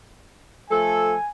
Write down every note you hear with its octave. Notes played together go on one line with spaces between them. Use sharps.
F3 A3 A4 G#5